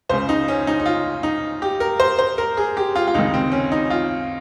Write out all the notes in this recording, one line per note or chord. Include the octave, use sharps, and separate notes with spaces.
C#2 C#3 C5
D#4
C#4
D#4
D#4
F4
D#4
G4
A#4
C5
C5
A#4
G#4
G4
F4
F4
C#2 C3 D#3 D#4
C4
C#4
D#4
F4